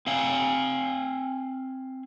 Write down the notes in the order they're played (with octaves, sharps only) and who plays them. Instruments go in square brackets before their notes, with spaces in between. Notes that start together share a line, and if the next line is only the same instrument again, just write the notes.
[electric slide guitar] C4 F5 G#5